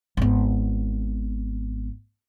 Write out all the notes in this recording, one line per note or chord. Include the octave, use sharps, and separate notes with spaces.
G#1 B3